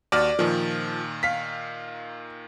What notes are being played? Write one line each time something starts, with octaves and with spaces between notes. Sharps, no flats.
D#2 F#4 D5 F6
A#2 D#3 F3
F5 B6